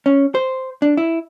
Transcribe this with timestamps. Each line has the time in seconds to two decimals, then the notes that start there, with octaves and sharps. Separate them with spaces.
0.06 C#4
0.35 C5
0.82 D4
0.97 E4